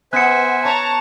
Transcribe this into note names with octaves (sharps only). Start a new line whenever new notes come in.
B3 C5 E5 G#5 F#6 C#7
C#5 A5 A#5 C#6